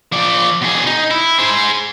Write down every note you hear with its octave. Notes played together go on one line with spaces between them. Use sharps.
F3 D5
B2 G#4
D#4
E4
G#4 C5